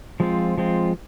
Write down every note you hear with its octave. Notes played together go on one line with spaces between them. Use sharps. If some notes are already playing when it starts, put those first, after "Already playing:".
F3 G#3 C4 F4
F3 G#3 C4 F4